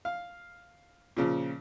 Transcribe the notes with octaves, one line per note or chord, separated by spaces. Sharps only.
F5
A#2 C#3 F3